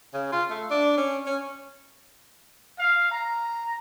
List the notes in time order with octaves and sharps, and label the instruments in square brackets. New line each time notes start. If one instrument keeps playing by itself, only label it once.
[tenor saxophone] C#3
F4
A3
D4
C#4
C#4
[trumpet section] F5
A#5